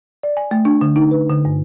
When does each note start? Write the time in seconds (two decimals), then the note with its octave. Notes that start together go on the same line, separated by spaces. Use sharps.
0.23 D5
0.37 G#5
0.51 A3
0.65 D4
0.81 D3
0.96 D#4
1.11 B4
1.30 D3
1.45 G2